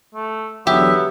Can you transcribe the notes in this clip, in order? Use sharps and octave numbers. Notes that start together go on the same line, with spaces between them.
A3
E2 D3 F#3 B3 G4 E5